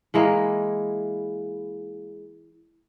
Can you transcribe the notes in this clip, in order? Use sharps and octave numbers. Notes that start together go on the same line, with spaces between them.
E3 G#3 A#3 E4